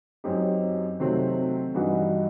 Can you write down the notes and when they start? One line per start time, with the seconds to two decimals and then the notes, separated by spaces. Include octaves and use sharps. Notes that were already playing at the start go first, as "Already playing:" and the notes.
0.24 F#2 F#3 C4 D#4 G4
1.00 C3 D#3 F#3 A3 C4
1.74 G2 E3 G3 D#4 F#4